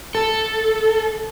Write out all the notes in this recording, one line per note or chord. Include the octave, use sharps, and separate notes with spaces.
A4